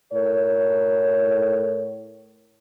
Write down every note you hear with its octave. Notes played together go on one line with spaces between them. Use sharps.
A2 A#4 C#5